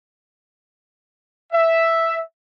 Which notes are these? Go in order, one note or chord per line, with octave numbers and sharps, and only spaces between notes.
E5